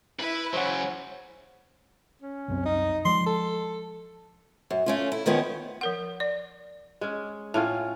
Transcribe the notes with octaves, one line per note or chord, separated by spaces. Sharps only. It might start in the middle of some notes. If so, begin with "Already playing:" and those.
E4 B4
C#3 F#3 C5 C#5 F#5
C#4
C2 F#2 C4
D#4
F3 G#3 C6
A4
F#2
A3 C#4 F4
E4
D#3 F3 A#3 B3 C#4
F3 A#4 F#5
D5
G#3 C#4
A2 C#4 F4 A5